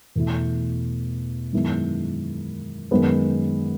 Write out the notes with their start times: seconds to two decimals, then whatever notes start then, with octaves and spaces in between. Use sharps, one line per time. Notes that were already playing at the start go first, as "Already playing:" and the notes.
0.15 E2 B2 A3 E4
1.53 F#2 D#3 G#3 B3 E4
2.91 F#2 D#3 G#3 B3